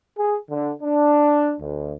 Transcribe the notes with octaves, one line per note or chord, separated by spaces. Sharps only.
G#4
D3
D4
D2